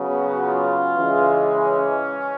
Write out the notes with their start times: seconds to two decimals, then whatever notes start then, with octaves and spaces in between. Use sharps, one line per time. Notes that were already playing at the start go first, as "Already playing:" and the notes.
Already playing: C#3 F#3 B3
0.12 F#4
0.40 F4
0.98 C#3 E3 G#3
1.54 C#4